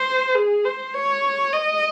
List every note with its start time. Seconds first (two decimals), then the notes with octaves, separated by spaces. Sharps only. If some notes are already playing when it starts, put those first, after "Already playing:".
Already playing: C5
0.35 G#4
0.65 C5
0.94 C#5
1.52 D#5